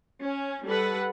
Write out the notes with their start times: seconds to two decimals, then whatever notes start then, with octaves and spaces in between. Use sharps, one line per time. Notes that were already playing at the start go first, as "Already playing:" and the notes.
0.21 C#4
0.65 G3 A4 B4 F#5